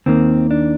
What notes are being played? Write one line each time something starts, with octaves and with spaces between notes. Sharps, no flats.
D#2 D#3 A#3 C4
D4